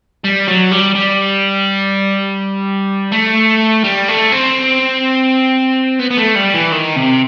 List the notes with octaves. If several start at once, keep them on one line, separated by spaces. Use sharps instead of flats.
G3
F#3
G3
G3
A3
G3
A3
C4
B3
B3
A3
G3
E3
D#3
C3